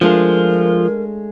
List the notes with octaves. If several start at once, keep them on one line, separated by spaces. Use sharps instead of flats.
F3 G#3 A3 D4 F4 A#4